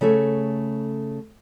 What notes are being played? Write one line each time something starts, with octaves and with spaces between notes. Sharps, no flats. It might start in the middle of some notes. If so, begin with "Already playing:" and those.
C#3 A3 A4 C#5